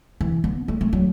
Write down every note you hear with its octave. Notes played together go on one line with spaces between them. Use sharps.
E3
B3
A3
A3
F#3